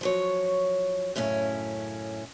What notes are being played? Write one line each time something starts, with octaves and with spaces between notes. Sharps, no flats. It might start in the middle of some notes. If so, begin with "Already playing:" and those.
F3 F#3 C#5
F#2 A2 C#3 C#4 E4